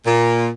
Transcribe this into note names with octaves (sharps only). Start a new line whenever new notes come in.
A#2